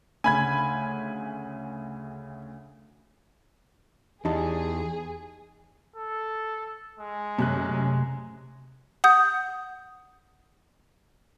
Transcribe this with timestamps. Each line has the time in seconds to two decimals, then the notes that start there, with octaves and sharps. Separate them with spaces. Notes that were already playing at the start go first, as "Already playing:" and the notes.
0.24 D2 C#3 G#5 B5 G#6
4.25 E2 D#4 G4 G#4 A5
5.96 A4
6.99 G#3
7.39 F#2 C3 A3 F#6
9.04 F#5 D#6 G6